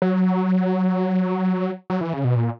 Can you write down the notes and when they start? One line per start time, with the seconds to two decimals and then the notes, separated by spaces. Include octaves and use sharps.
0.02 F#3
1.90 F#3
2.01 E3
2.13 C#3
2.24 B2
2.36 A#2